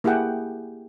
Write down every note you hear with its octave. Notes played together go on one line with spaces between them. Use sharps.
A#3 E4 G4 G#4 F#5 G5